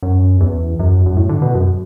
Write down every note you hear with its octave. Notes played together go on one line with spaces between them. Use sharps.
F#2
E2
F#2
F#2
A2
D3
B2
F#2